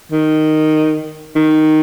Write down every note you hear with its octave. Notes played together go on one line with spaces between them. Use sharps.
D#3
D#3